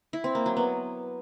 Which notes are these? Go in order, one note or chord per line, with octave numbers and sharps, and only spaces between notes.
E4
C4
A#3
F#3
B3